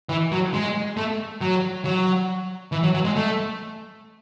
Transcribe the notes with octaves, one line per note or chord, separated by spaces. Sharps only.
E3
F#3
G#3
A3
F#3
F#3
E3
F#3
F#3
G#3
A3